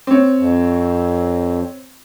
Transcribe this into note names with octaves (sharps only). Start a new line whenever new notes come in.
C4 C#5
F2